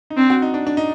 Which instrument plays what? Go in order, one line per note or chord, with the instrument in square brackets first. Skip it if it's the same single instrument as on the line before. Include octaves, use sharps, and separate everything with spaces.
[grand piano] D#4
[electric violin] C4 [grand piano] D4
[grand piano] F#4
D#4
D4
D4
D#4